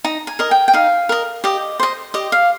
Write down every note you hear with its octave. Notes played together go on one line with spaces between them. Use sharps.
D#4 A#5
G#5
A#4 D#5
G5
G5
D#4 F5
A#4 D#5
G4 D#5
C5 D#5
G4 D#5
F5